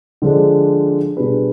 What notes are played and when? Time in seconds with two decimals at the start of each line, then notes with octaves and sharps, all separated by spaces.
0.22 D3 F3 G#3 D4
1.17 B2 G3 D4 G#4 B4